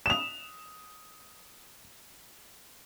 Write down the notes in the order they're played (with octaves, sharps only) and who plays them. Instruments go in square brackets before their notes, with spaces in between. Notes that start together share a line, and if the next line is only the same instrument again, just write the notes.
[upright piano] E7 F7